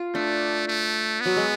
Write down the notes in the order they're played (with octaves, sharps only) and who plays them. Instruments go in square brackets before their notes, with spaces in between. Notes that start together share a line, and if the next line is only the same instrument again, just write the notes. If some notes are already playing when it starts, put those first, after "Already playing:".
Already playing: [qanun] F4
[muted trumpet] A3 [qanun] D4
[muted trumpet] A3
[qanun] F#3 [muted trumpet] B3
[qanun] G#3